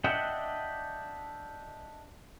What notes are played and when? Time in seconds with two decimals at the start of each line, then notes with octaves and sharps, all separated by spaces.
0.04 D4 D#5 E5 F#5 G5